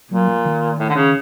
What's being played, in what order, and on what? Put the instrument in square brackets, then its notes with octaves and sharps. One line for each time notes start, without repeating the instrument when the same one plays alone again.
[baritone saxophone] A#2 [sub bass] F#3
[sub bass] F3
D#3
[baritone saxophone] A2
D3
C#3